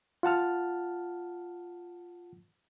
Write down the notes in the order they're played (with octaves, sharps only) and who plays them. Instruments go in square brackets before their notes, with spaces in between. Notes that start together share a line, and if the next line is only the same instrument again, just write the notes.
[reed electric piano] F4 F#5 A5 F6